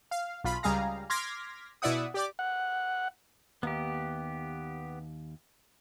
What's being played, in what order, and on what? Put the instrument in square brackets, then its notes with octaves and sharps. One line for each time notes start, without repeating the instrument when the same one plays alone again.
[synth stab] F5
B1 F4 B5
C#2 G3 G#4 F5 A#5
C6 D6 F6 G#6 A#6 B6
B2 E4 D5 E5 F#5 D#6
G4 D5 D6
[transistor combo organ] F#5
[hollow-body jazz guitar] D#2 [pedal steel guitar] B3 G4